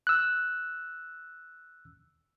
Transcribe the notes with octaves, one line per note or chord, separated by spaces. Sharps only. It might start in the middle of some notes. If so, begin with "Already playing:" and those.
E6 F#6